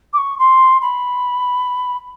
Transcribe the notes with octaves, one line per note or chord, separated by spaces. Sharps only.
D6
C#6
C6
B5